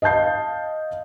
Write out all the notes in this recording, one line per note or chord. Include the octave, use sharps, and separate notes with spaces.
D#5 F5 A5 G6 C7